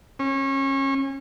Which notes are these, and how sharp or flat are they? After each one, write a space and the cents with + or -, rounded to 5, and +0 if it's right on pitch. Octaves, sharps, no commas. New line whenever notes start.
C#4 -30